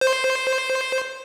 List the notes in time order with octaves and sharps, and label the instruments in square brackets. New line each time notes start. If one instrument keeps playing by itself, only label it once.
[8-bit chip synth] C5